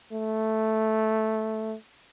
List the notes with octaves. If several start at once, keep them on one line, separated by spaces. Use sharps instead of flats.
A3